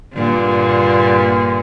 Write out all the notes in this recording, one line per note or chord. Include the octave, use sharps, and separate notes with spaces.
G2 A#2 D3